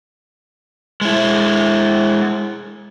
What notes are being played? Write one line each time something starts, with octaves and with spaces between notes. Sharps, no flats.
G#3 E4